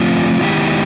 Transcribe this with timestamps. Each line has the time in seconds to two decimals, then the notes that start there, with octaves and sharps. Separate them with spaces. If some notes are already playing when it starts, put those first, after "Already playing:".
Already playing: D3 F3 A3 C4 F4
0.41 D#3 G#3 B3 E4 G4